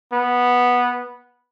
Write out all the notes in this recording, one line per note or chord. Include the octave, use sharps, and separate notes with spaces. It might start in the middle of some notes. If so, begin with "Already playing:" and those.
B3